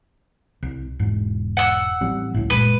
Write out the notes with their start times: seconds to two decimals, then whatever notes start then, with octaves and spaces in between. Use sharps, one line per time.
0.63 C2
0.99 E1 G#2
1.57 F#5 E6
2.01 A1 G3 C4
2.34 C#2 A2
2.50 F#1 A#2 G#3 B4